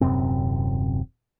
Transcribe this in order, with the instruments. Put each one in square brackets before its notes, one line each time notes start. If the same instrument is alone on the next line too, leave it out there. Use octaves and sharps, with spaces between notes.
[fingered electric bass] D#1 F#2 C3 C4